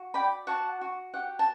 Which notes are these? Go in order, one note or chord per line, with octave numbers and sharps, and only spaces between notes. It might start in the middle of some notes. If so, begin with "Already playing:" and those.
Already playing: F#4
D5 G5 B5
F#4 F#5 A5
F#4
G4 F#5
A5